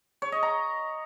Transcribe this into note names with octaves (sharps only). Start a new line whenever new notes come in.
C#5
D#5
A#5